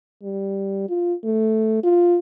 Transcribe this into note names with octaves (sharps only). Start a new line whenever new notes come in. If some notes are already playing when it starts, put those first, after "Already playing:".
G3
F4
A3
F4